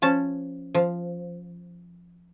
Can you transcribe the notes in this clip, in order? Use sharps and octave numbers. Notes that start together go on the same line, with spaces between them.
F3 C#4 A5
F3